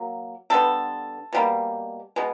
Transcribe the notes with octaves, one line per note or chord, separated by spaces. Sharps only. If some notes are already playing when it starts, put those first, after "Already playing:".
Already playing: F#3 A#3
D3 G3 B3 A4
B2 G3 A#3
B2 G#3 B3